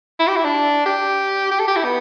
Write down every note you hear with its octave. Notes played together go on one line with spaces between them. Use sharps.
E4
G4
E4
D4
G4
G4
A4
G4
E4
B3